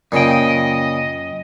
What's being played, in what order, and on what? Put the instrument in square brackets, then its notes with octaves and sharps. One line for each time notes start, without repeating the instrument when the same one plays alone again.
[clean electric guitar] F#2 G5 [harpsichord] A#2 C#3 [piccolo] D#5